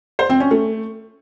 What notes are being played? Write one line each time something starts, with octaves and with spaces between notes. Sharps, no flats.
C5
C4
C#4
A3